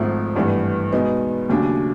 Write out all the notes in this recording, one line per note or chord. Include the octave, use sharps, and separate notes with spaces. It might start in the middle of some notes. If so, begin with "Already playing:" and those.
Already playing: G#1 G#2 F3 A3
G#1 G2 E3 A3
B2 G#3 B3 D#4
D#2 C#3 F#3 A3 D4